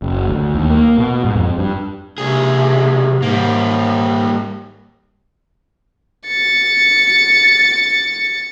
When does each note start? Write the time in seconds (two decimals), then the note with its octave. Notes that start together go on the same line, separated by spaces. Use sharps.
0.02 F#1
0.28 D2
0.54 D#2
0.70 A#3
0.98 B2
1.24 G#2
1.36 F2
1.58 G2
2.18 B1 C3 G#4
3.22 G#2 G3 A#3
6.26 A6 C#7